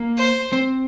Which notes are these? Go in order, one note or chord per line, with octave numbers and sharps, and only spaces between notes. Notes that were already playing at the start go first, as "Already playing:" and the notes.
Already playing: A#3
C5
C4